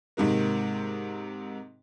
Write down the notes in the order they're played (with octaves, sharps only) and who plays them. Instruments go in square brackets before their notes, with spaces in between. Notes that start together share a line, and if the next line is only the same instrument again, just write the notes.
[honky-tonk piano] G#2 C3 D#3 A#3